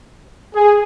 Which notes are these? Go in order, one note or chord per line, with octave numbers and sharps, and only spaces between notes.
G#4